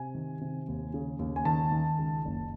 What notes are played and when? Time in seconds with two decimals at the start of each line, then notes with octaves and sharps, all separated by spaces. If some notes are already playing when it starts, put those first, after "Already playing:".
Already playing: C3 G#5
0.15 D#3
0.41 C3
0.68 D#2
0.94 C#3
1.19 D#2
1.36 G#5
1.45 D#3 A5
1.72 D#3
1.98 C#2
2.25 F#1